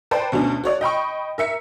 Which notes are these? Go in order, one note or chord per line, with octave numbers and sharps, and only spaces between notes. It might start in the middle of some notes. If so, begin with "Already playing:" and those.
B4 C5 D5 G5 A5
D2 B2 C#4 D4
F#4 C#5 D5
D#5 G5 B5 C#6
A#4 E5 C#7